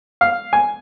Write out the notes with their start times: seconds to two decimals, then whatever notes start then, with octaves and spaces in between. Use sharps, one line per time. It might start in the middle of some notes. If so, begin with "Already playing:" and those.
0.21 F5
0.53 G#5